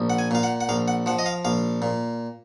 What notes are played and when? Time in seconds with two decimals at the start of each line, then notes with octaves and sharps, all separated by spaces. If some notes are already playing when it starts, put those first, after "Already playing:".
Already playing: A#1
0.10 F#5
0.19 G#5
0.31 A#2 F5
0.43 F#5
0.61 F#5
0.69 A#1 F5
0.88 F#5
1.06 F3 F#5
1.19 D#5
1.26 F5
1.45 A#1 F5
1.82 A#2